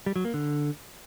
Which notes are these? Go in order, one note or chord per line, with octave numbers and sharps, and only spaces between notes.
G3
F#3
A#3
D3